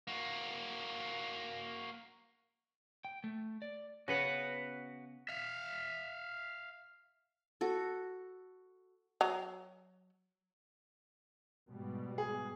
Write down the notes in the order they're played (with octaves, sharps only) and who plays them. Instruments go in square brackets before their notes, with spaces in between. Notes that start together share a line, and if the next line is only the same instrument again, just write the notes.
[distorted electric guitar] A#3 F#4
[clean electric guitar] G5
A3
D5
[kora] C#3 B3 [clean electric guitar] F#4 B4 F#5
[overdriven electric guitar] E5 F5
[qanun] F#4 A4
[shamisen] F#3 A#5
[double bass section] G#2 B2 G3
[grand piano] G#4